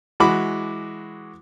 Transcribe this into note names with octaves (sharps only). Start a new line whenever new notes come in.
E3 G#3 F#4 B5 D6